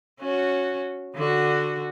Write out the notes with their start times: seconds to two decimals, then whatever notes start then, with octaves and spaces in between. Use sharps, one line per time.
0.20 C#4 F#4
1.15 D3 F#4